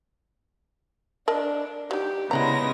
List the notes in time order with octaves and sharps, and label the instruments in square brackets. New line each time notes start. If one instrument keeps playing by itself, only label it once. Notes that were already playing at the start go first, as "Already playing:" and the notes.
[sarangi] D4 [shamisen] A#4 D#5 A5
[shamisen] F#3 D#4 [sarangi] G4
[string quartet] C#3 G#3 A#6 [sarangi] B3 [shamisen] E4 D5 A#5